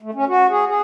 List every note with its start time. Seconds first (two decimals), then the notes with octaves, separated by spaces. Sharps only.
0.02 A3
0.14 C#4
0.28 F#4
0.50 G#4
0.68 G#4